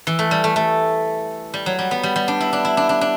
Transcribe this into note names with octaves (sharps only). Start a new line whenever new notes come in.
E3
A3
G3
A3
A3
G3
F#3
G3
B3
G3
G3
D4
E4
D4
E4
D4
D4
D4